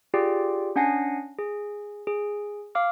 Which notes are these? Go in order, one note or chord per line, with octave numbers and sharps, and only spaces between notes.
F4 G4 G#4 D5 G5
C#4 D4 F#5 G#5 A#6 C7
G#4
G#4
F5 D6 F6